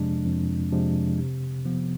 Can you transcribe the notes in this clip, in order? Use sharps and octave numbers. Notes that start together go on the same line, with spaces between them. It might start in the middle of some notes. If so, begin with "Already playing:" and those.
Already playing: F2 C3 F3 G#3 D4
F2
C3 F3 G#3 D4
C3
F3 B3